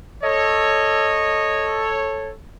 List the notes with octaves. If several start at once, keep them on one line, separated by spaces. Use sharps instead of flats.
A4 C#5 D#5